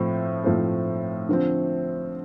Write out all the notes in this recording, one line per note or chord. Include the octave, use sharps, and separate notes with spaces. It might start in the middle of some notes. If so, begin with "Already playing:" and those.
Already playing: A2 F3 A3 C4
A2 F3 A3 C4
D3 F3 C4